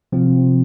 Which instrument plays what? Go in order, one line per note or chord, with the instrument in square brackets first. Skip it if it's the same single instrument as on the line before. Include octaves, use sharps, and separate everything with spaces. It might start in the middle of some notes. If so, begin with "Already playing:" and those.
[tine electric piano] C3 F3 C4 F4